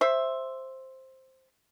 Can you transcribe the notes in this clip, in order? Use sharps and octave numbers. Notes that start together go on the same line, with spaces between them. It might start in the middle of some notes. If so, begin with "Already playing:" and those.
C5 E5